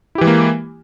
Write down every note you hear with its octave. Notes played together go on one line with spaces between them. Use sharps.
E3 G#3 A#3 E4 G4